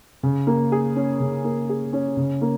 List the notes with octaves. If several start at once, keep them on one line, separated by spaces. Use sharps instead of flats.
C#3
A#3
G#4
C#4
C#3
A#3
G#4
C#4
C#3
A#3